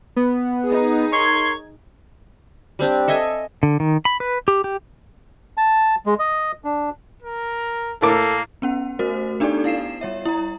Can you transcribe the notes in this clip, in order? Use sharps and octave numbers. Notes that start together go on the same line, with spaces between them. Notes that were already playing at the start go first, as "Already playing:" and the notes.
B3
D#4 G#4
A#4 C#5 C6 G#6
G3 C4 D4 G4
A4 D#5 E5 G#5
D3
D#3
B5
B4
G4
G4
A5
G#3
D#5
D4
A#4
A2 A#3 A4 A#4 D6
B3 C#4 F#5
A3 F#4 A#4 C5
B3 D4 D#4 G4 A4 D5
E4 F5 C7 E7
G3 C#5 E5
E4 A#5